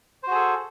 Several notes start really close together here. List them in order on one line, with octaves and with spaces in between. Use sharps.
C5 F#4 G#4 A4